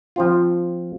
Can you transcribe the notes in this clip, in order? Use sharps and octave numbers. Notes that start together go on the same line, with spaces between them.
F3 C4 F4